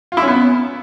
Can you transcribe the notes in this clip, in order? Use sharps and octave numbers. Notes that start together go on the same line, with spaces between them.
F4
E4
C#4
B3